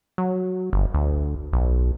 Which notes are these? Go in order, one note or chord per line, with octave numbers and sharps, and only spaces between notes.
F#3
G1
D2
B1